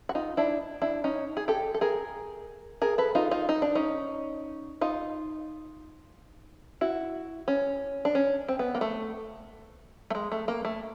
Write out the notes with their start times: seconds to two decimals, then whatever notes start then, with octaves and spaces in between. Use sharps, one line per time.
0.09 F#4
0.15 D#4 F4
0.37 D4 E4
0.82 D4 E4
1.04 C#4 D#4
1.37 G#4
1.48 G4 A4
1.74 A4
1.81 G#4 A#4
2.82 G#4 A#4
2.98 A4 B4
3.15 D#4 F4
3.31 D#4 F4
3.49 D#4
3.62 D4
3.75 C#4 D#4
4.81 D#4 F4
6.81 E4 F#4
7.48 C#4
8.05 D4
8.15 C#4
8.48 C4
8.59 B3
8.75 A#3
8.81 A3
10.10 A3
10.15 G#3
10.32 A3
10.48 A#3
10.65 A3